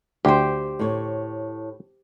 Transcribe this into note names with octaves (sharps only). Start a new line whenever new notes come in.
D2 G4 C5 G5
A2 C#5